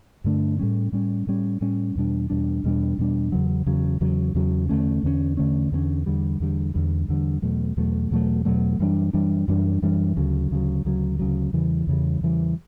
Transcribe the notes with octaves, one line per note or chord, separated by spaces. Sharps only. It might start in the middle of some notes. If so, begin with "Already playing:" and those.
G2 D3 A3 D4
A2 G3 C#4
A2 G3 C#4
A2 G3 C#4
A2 G3 C#4
E2 B2 G3 D4
E2 B2 G3 D4
E2 B2 G3 D4
E2 B2 G3 D4
E2 C#3 F#3
E2 C#3 F#3
E2 C#3 F#3
E2 C#3 F#3
E2 D3 A3 C#4
E2 D3 A3 C#4
E2 D3 A3 C#4
E2 D3 A3 C#4
E2 D3 G3
E2 D3 G3
E2 D3 G3
E2 D3 G3
E2 B2 F#3 A3
E2 B2 F#3 A3
E2 B2 F#3 A3
E2 B2 F#3 A3
F#2 E3 G3 D4
F#2 E3 G3 D4
F#2 E3 G3 D4
F#2 E3 G3 D4
D2 C#3 F#3
D2 C#3 F#3
D2 C#3 F#3
D2 C#3 F#3
E2 C#3 E3 G3
E2 C#3 E3 G3
E2 C#3 E3 G3